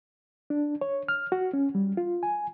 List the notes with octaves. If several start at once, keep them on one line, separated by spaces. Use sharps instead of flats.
D4
C#5
F6
F#4
C#4
G3
F4
G#5